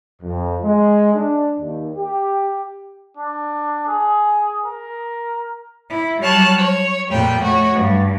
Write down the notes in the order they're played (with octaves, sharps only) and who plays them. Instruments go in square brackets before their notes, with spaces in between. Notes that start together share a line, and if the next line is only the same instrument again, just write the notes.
[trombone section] F2
G#3
D4
D#2
G4
[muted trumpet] D4
G#4
A#4
[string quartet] E4
F#3 G3 C#5 A5 F6 F#6
C#5
F2 A#2 G3 G5
A3 F#4 C#5
G2